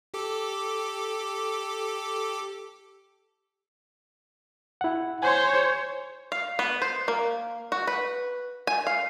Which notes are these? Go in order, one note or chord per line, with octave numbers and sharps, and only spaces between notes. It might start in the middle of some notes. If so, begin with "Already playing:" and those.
G4 A4 D6
E4 F#5
C5 C#5 G#5 C6
F5
B3
C5
A#3
F#4
B4
G#5
F5